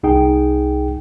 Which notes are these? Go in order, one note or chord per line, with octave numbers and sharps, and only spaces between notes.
C2 D#4 G#4 G5